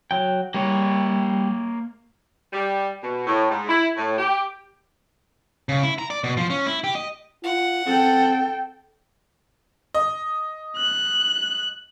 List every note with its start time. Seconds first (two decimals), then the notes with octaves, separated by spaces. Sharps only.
0.11 F#3 G5
0.54 G3 A#3 C#5
2.53 G3
3.03 B2
3.27 A2
3.51 G#2
3.68 E4
3.97 A2
4.18 G4
5.69 C#3
5.83 E4
5.99 A#5
6.10 D5
6.24 B2
6.37 F3
6.50 C#4
6.66 E4
6.84 G4
6.95 D#5
7.44 F4 F#5
7.86 C4 A4 G5
9.94 D#5
10.77 F#6